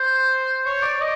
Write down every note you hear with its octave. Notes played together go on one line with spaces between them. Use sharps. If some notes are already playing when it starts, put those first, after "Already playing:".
Already playing: C5
C#5
D5
D#5